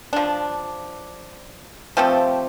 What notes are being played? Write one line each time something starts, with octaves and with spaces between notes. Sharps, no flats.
F3 D4
F3 A3 C4 G4